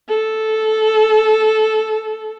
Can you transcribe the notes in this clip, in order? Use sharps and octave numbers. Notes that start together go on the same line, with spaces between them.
A4